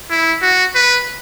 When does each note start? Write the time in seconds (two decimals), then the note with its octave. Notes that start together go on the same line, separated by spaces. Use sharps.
0.11 E4
0.42 F#4
0.75 B4